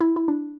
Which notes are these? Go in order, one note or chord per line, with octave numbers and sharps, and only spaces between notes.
E4
E4
D4